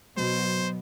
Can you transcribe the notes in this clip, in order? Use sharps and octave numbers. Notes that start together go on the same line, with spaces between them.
B2 F#3 C5